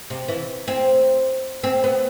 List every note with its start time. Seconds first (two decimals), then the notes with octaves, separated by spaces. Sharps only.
0.10 C3
0.28 E3
0.68 C4
1.64 C4
1.84 B3